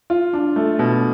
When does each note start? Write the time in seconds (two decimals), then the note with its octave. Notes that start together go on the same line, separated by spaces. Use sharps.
0.10 F4
0.33 D4
0.56 A3
0.79 B2